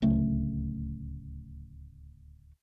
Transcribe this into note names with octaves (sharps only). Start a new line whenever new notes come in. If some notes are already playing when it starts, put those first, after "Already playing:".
D1 C#2 A3